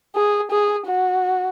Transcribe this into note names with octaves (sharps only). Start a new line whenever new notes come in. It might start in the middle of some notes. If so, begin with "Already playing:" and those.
G#4
G#4
F#4